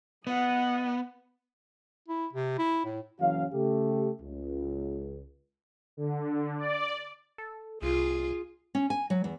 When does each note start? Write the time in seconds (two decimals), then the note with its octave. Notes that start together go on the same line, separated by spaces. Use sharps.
0.27 B3 D#5 F#5
2.08 E4
2.33 C3
2.59 E4
2.85 A2
3.20 F#1 E3 F#3 C#4 F#4 F5
3.53 C#3 A3 G4
4.21 C#2
5.97 D3
6.58 D5
7.38 A4
7.82 C2 F4 G#4
8.75 C#4
8.90 G#5
9.10 F#3
9.24 E2